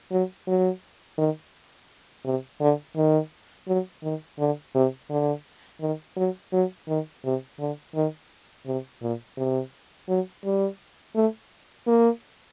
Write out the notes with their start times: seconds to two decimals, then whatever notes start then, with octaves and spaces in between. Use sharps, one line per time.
0.11 F#3
0.47 F#3
1.18 D#3
2.25 C3
2.60 D3
2.97 D#3
3.68 F#3
4.03 D#3
4.39 D3
4.75 C3
5.10 D3
5.81 D#3
6.17 F#3
6.52 F#3
6.88 D#3
7.24 C3
7.59 D3
7.95 D#3
8.66 C3
9.02 A#2
9.37 C3
10.09 F#3
10.44 G3
11.15 A3
11.87 A#3